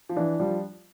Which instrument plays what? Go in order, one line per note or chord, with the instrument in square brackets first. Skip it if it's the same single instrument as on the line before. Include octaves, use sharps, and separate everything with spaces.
[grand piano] F3
[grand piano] E3 [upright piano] D4
[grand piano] F3 [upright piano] G3